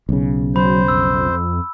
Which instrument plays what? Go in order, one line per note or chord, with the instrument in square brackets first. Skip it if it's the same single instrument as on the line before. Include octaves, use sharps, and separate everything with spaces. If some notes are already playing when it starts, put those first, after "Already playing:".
[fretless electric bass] B1 C#3
[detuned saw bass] F#3 [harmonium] C5 [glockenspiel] B5
[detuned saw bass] F2 [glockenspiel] E6